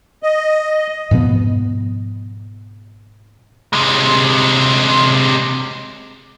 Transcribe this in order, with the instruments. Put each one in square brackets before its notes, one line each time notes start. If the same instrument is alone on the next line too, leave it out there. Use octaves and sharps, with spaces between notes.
[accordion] D#5
[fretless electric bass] G#2 B2 F3 B3
[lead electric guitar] C3 G#3